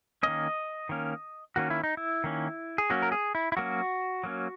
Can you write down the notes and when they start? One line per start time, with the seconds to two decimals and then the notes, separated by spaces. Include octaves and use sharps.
0.23 D#3 A#3 C#4 D#5
0.89 D#3 A#3 C#4
1.56 D#3 A#3 C#4 F#4
1.70 E4
1.84 D#4
1.97 E4
2.24 D#3 A#3 C#4
2.78 G#4
2.90 F#3 A#3 C#4 F#4
3.02 A#4
3.12 G#4
3.35 E4
3.52 E4
3.57 F#3 A#3 C#4 F#4
4.24 F#3 A#3 C#4